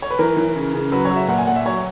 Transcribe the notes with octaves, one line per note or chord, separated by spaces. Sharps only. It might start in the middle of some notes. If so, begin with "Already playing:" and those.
C#5
B4
E3 A#4
E3
C#3
C#3
F#3 B4
C#5
F#3
E5
A#2 F#5
G#5
A#2 F#5
E5
F#3 C#5